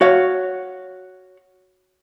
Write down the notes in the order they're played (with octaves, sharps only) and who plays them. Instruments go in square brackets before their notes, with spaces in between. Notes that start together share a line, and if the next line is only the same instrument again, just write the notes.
[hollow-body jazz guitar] F#4 C#5 F5